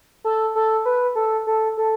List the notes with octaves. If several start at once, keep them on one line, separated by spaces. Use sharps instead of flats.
A4
A4
B4
A4
A4
A4